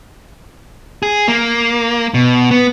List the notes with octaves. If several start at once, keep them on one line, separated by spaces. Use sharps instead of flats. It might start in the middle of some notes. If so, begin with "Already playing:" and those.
G#4
A#3
B2
B3